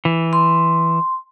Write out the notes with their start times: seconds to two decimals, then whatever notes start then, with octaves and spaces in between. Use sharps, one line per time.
0.05 E3
0.33 C6